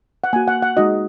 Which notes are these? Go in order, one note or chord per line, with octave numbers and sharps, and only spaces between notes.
F#5
A#3 F#4 G#5
F#5
F#5
G#3 D#4 F#4 D#5